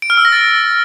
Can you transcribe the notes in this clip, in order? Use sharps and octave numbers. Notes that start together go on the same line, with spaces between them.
D7
F6
E6
A#6
A6